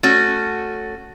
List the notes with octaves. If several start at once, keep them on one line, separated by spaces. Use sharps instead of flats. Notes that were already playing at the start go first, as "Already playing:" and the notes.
A3 C#4 F#4